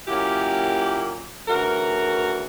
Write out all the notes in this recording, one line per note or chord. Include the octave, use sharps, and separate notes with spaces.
A#2 F#3 A#3 C#4 E4 G4
D2 C#3 E3 F#4 A#4